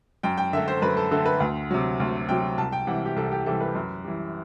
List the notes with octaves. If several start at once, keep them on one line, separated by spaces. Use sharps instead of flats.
F#2 G5
G5
D3 A3 E5
C5
F#2 B4
A4
D3 A3 A4
B4
D2
C3 F#3
D2
C3 F#3 G5
C2 A5
G5
C3 E3 G3 F#5
G4
C2 A4
G4
C3 E3 G3 A4
B4
F#2
E3 G3